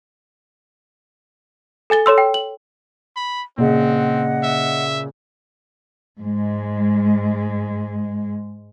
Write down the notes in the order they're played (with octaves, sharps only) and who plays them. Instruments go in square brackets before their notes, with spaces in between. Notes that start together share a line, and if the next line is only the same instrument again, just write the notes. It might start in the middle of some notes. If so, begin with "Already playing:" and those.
[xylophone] A4 G#5 A6 G7
A4 C#5 C6 E6
G5
F#7
[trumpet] B5
[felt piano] A#2 C#3 [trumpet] C4 [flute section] D#5 F#5
[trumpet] E5
[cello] G#2 G#3